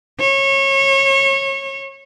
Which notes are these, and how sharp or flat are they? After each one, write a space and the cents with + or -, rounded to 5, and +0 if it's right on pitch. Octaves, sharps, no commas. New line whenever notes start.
C#5 -25